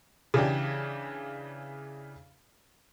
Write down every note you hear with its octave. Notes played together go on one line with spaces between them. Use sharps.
C#3 E3 D4 G4